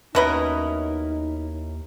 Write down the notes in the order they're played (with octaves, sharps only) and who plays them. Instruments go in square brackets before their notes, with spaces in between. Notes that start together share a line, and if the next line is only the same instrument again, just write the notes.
[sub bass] D#2 [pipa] B2 B4 D#5 [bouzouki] C#4 E4 A#4 [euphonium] D#4